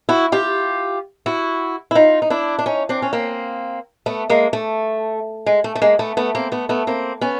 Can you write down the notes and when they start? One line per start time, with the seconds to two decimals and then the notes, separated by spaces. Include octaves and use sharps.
0.09 E4 F#4
0.32 F4 G4
1.26 E4 F#4
1.91 E4
1.95 D#4 F4
2.22 D#4
2.30 D4 E4
2.59 D4
2.66 C#4 D#4
2.89 C4 D4
3.02 C#4
3.13 A#3 C4
4.06 A3 B3
4.30 G#3 A#3
4.53 A3
5.46 G#3
5.64 A3
5.75 A3
5.82 G#3 A#3
5.99 A3 B3
6.17 A3 B3
6.35 A#3 C4
6.52 A3 B3
6.69 A3 B3
6.87 A#3 C4
7.21 B3 C#4